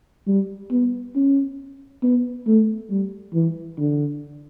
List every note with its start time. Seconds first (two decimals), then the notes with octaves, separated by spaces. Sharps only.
0.27 G3
0.71 B3
1.15 C#4
2.03 B3
2.47 A3
2.91 G3
3.34 E3
3.78 D3